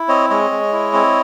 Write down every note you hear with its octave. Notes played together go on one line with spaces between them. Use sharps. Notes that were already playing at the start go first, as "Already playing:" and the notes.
Already playing: E4
C4 C#5 D#5
G#3 C#5 D#5
G#3
E4
C4